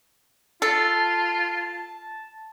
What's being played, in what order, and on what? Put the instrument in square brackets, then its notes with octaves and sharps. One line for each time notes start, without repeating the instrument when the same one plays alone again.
[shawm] F4 [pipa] A4 [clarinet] A5